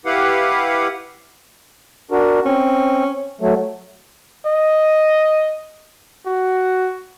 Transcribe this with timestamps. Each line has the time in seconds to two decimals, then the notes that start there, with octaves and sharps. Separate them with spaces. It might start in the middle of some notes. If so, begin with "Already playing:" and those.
0.06 E4 G4 B4 F5 F#5
2.11 D4 F#4 A#4
2.46 C4 C#4
3.41 F#3 A3
4.46 D#5
6.26 F#4